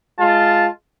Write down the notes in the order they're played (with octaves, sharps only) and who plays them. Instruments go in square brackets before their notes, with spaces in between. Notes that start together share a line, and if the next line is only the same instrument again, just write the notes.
[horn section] G#3 F4 A5